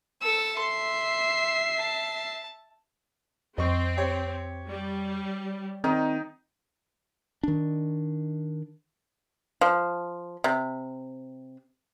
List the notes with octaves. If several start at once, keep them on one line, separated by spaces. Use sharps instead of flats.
A4 E6
E5 C6 C7
A5
F2 C4 D#5 C#6
G4 C#5
G3
D#3 C4 D#4
D#3 D4
F3
C3